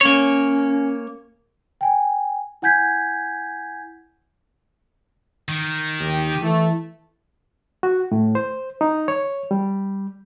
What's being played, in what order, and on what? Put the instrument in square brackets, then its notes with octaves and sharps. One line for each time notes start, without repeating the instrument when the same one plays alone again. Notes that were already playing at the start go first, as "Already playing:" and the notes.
[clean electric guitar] A#3 C#5 [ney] C#4
[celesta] G5 G#5
E4 F#5 G#5 G6 G#6 B6
[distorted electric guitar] D#3
[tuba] D#2 [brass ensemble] G4
[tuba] E3 [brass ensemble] A3
[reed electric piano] F#4
A2
C5
D#4
C#5
G3